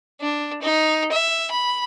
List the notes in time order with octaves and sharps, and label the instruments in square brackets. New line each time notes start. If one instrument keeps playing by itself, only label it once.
[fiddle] D4
D#4
E5
B5